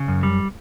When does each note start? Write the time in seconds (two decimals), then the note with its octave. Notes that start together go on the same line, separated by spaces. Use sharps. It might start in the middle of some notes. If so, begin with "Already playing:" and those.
Already playing: C#3
0.08 F#2
0.23 G3